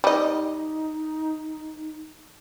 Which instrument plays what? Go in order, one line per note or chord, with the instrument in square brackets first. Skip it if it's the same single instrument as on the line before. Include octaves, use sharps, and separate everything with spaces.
[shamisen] G3 D#5 [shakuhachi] D#4